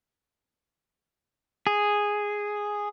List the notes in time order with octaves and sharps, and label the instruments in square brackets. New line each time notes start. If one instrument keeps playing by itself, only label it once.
[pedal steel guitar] G#4